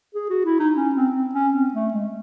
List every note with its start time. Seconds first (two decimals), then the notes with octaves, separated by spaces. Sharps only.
0.14 G#4
0.30 F#4
0.45 E4
0.59 D#4
0.75 C#4
0.95 C4
1.14 C4
1.34 C#4
1.54 C4
1.74 A3
1.93 G#3